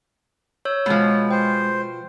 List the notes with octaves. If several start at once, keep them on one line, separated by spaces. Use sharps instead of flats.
C#5 E6 G6
B2 F3 G#3
C5 G5